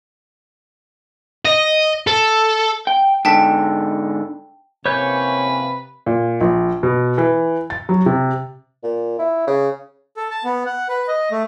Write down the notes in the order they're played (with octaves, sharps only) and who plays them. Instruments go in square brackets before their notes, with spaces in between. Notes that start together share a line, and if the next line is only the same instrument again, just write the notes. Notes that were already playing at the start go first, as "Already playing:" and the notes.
[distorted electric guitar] D#5
A4
[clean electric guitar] G5
[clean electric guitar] G#2 D3 [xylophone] G5 A5 B6
[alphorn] C3 [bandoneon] E3 A#3 C#4 [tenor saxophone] B4 [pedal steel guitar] C#5 G6
[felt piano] A#2
A#1
B2
E3
A6
F#3
C3
[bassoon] A#2
E4
C#3
[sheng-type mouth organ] A4
A5
B3
F#5
B4
D#5
A3